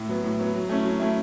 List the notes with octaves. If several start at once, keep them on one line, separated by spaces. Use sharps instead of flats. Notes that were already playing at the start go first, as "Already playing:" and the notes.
Already playing: A2
F#3 B3
A2
F#3 B3
F#3
A3 C#4 E4
F#3
A3 C#4 E4